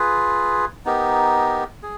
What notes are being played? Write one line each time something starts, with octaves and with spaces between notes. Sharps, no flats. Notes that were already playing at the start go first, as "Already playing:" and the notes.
Already playing: F4 G#4 B4
B3 D#4 G4 A#4
G#4